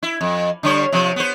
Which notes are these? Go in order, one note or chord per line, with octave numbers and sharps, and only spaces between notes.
E4
F2
D3 G3 C#5
C3 F3
B3 C5